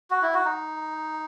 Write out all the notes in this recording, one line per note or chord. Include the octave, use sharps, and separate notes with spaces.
F#4
E4
F#4
D#4